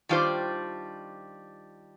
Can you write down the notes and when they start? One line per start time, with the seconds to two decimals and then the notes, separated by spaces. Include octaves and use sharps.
0.09 D#3 G3 D4 F4 C5